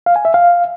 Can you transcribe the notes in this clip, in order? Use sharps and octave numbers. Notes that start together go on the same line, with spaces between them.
F5
G#5
E5
F5